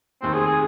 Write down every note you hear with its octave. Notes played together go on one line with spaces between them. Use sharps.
F1 D#2 D#3 C4
G#4
G#4